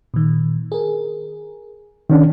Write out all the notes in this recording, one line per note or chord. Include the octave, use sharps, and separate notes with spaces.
A#2 D#3
G#4 A#4
D#3 C#4 D4